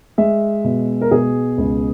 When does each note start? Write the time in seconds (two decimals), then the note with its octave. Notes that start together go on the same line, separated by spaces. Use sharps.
0.18 G#3 E5
0.64 B2
1.01 A#4
1.11 B2 G#4
1.58 C#2